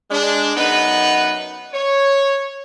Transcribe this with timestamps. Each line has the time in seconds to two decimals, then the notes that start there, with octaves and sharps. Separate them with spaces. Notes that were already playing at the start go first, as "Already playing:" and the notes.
0.11 G#3 D4
0.56 F#2 B3 D#4 B4
1.73 C#5